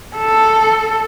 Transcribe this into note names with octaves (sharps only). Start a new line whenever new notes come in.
A4